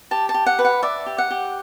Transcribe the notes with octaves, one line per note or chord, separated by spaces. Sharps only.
G4 A5
A5
G4
F#5
B4
F#5
D5 E5
G4
F#5
G4